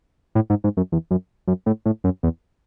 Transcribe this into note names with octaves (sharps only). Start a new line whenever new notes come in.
A2
G#2
G#2
F#2
E2
F#2
F#2
A2
A2
F#2
E2